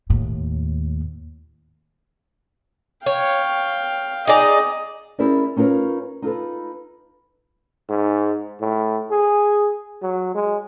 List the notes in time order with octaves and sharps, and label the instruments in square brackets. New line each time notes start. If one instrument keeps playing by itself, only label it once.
[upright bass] D#2 A2
[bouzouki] C#5 [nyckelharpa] F5 G5
[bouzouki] D#4 G#4 D5 [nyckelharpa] D#5
[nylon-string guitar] C#4 E4 G#4 A#4 C5 D5
C#4 D#4 F4 A#4 B4 C#5
D#4 F4 A4 B4
[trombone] G#2
A2
G#4
F#3
G#3